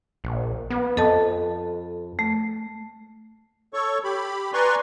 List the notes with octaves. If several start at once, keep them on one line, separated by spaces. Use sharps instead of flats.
A#1
B3
F2 A4 D#5 A5
A3
A4 C#5 C#6
G4 B5
B4 D5 G#5 A#5 C6 C#6